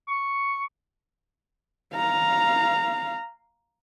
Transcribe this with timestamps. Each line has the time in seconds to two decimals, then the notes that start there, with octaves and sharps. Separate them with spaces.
0.08 C#6
1.95 F5 A#5